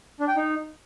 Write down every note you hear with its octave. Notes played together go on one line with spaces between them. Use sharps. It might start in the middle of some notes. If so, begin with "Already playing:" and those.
D4
G5
D#4